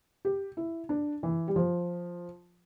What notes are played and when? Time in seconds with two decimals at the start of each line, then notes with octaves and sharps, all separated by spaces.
0.25 G4
0.57 E4
0.89 D4
1.23 E3
1.48 G3
1.56 F3